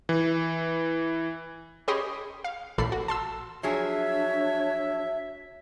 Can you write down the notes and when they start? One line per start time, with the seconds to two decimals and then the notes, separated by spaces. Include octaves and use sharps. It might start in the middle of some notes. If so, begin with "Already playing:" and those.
0.09 E3
1.88 C#4 G4 G#4 D#5 B5 C6
2.44 F5
2.78 A1 A#2 A4 B5 C7
2.92 F#4
3.08 A5 C6 E6
3.63 F3 F#3 D4 G#4 C#5 E5